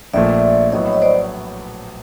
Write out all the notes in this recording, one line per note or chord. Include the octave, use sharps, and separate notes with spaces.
A#1 A#2 F3 A3 D5 E5
A#1 A2 F#3 B3 E4 C#5 D#5
D#5
C5 D5